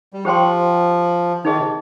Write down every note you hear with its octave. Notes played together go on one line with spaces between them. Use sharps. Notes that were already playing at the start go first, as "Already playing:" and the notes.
G3
F3 G4 C5 G5 C6
D#3 D#4 G#4 D#5
C3